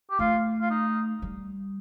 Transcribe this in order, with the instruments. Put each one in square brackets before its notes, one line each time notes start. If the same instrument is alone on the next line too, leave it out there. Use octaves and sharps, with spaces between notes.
[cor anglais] G4
[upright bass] A3 [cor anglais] F4
[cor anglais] F4
D#4
[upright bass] G3